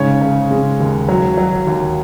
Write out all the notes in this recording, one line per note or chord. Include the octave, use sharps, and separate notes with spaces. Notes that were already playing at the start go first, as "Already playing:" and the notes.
Already playing: G#2 C#3 C#4 C#5
C#3
G#3
D#2
F#3
F#3
D#2